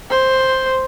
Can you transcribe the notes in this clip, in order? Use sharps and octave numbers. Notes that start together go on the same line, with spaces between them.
C5